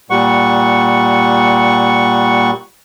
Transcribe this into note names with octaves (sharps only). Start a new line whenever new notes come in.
A#2 G3 F#5 C#6